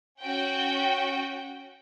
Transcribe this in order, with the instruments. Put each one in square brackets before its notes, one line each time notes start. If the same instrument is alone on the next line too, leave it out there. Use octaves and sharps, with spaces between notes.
[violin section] C#4 F#4 G5